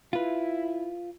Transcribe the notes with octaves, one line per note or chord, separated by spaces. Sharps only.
E4 F4 B4